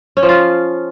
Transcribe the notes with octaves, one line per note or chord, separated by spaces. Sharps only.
C#4
F3
F4